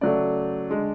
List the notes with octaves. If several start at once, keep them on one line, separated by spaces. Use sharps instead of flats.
C#3 F#3 A3 D5
D3 G#3